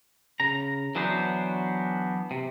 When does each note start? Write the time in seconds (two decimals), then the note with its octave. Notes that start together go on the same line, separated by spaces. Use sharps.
0.40 C#3 A#5
0.95 E3 F#3 B3 D4 C5
2.31 C3